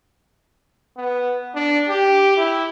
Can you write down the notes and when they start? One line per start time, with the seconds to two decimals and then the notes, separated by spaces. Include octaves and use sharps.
0.97 B3
1.55 D4
1.89 G4
2.37 E4